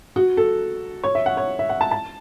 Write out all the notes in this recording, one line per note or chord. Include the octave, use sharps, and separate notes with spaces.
F#4
A4
C#5
E5
F#5
C#5
E5
F#5
A5
A5